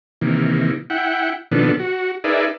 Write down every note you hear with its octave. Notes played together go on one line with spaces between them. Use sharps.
C3 D#3 E3 A#3
E4 F#5 G5
B2 D#3 F3 B3 D4 A4
F#4
D#4 G#4 A#4 B4 D5 E5